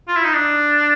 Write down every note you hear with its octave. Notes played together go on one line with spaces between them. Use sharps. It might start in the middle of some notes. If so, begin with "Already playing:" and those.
F4
E4
D#4
D4